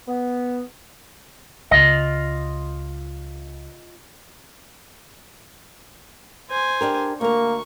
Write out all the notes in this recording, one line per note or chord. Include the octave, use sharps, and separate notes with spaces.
B3
C#2 F4 D#5
C5 G#5
D4 G4 A#4
D2 A#3 A#4 C#6